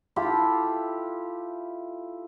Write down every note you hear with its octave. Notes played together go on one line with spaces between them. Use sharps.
E4 F4 G4 A4